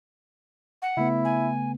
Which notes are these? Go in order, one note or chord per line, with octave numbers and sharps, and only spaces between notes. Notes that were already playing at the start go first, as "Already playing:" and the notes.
F#5
C#3 A3 B3 E4
G#5